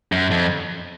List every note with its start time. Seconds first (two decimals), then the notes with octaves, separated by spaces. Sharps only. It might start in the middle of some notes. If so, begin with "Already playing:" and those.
0.12 F#2
0.31 F2